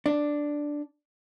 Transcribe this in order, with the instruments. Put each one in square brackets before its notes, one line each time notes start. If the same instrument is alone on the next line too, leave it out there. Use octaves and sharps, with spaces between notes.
[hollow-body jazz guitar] D4